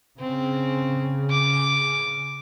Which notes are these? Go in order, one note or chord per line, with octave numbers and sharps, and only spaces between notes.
C#3 C4
D6